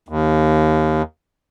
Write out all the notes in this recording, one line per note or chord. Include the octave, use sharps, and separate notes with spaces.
D#2